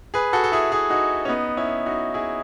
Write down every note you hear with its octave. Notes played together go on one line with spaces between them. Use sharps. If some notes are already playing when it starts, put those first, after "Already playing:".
G#4 B4
F#4 A4
A4
E4 G#4
E4 G#4
D#4 F#4
C#4
B3 D#4
C#4 E4
D#4 F#4
E4 G#4